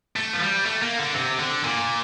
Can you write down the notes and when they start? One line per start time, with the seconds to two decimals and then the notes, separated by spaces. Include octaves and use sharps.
0.16 A3
0.34 F3
0.41 G3
0.65 A3
0.82 A#3
0.99 D3
1.14 C3
1.39 D3
1.65 A#2